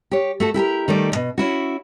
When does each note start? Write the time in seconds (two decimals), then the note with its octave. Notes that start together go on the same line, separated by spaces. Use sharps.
0.11 G4 C#5
0.40 A3 F#4 A4
0.54 E4 G4 A4 A#4
0.88 D#3 G3 A3 D5
1.12 D2 B2
1.38 C#4 E4 F#4